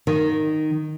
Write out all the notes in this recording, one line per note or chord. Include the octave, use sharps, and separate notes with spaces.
D#3